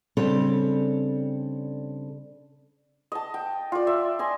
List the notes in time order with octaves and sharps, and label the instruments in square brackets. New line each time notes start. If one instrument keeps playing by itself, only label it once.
[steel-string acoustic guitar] C#3 G3 C4 D4 A4 C#5
[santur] D#5 A5
G5
F4 D5
E5
D#5 G#5 C6